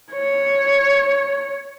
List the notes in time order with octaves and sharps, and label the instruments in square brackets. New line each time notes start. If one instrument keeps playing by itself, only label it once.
[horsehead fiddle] C#5